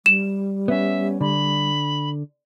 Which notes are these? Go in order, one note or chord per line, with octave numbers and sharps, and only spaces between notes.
G3 E7
B3 C#4 E5
D3 B5